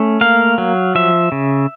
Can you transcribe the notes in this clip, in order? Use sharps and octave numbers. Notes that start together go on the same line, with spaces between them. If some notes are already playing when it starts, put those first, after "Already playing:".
Already playing: A3 C#4
A#3 F5
F#3
F3 E5
C#3